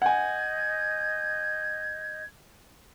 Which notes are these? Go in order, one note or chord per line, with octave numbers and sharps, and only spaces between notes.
D#5 F#5 G#5 G6 G#6